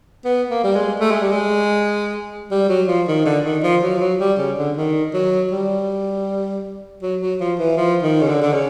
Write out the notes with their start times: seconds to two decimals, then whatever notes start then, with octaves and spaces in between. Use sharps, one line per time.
0.25 B3
0.50 A#3
0.64 G3
0.75 G#3
1.00 A3
1.11 G#3
1.21 G3
1.31 G#3
2.51 G3
2.69 F#3
2.88 F3
3.07 D#3
3.26 D3
3.45 D#3
3.63 F3
3.83 F#3
3.97 F3
4.01 F#3
4.20 G3
4.38 C#3
4.58 D3
4.77 D#3
5.14 F#3
5.51 G3
7.02 F#3
7.21 F#3
7.40 F3
7.59 E3
7.77 F3
8.03 D#3
8.22 C#3
8.28 D3
8.42 D3
8.53 C#3